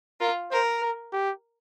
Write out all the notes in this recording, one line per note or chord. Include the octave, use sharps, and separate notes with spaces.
F4 A#4
A#4 C5
A#4
G4